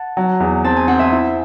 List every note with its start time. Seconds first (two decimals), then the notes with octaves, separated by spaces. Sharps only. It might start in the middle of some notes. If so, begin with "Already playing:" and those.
Already playing: F#5 A5
0.17 F#3
0.40 E2
0.64 C4 A5
0.76 G#5
0.88 C4 F#5
0.99 E5 G#5
1.12 E4